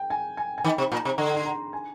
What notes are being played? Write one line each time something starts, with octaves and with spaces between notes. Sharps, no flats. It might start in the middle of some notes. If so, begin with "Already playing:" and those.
Already playing: G5
G#5
G#5
G#5
D#3 G5
C3
A#2 A#5
C3
D3 C6
C6
A#5
G#5